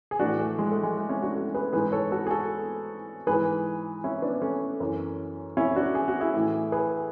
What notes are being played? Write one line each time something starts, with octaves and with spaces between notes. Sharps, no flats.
G#4
A2 E3 D4 F#4
A3
G#3
A3
G#3
A3
C#4 E4
D4 F#4
F#4 A4
G#4 B4
G#2 E3 G#4 B4
A4 C#5
F#4 A4
G#4
F#4 A4
G#2 E3 G#4 B4
C#4 E4
B3 D4
A3 C#4
F#2 E3
C#4 E4
D4 F#4
G#4
F#4
E4 G#4
A2 E3
G#4 B4